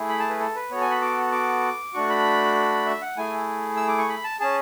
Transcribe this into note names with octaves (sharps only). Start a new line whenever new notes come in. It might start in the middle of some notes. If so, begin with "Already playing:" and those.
Already playing: A3 E4 G#4
B5
A5
B4
A4
B4
B3 F#4 A4 C#5
G#5
B5
D6
D6
A3 D4 F#4 C#6
B5
E5
F#5
A3 E4 G#4 G#5
E6
D6
C#6
B5
A5
C#4 G#4 A5